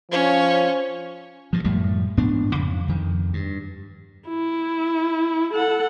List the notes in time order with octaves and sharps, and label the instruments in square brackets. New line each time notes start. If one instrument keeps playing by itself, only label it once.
[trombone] F3 [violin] C#4 C#5
[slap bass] G2 F3
F#2 A2 F3 G3
A1 G#2 B3 D4
F2 C#3
F2 D#3
G2
[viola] E4
A4 F#5